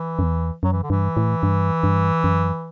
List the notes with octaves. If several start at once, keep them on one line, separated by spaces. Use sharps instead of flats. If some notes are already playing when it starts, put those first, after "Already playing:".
Already playing: E3
F#2
E2
F#2 F#3
E3
D3
G2 E3
A2
G2
G2
F#2